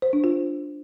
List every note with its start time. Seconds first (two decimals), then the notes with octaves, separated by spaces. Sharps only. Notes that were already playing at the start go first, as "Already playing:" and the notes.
0.02 C5
0.13 D4
0.24 F4